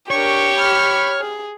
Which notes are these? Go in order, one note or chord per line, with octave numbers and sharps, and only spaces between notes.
D4 G4 A#4 C#5 C#6
B5 F6
G#4